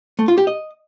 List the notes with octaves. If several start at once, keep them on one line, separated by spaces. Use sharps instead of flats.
A3
F4
G4
D#5